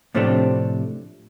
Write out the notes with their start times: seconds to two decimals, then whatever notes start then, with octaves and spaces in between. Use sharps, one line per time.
0.15 A2 C3 F3 A3 C4 D4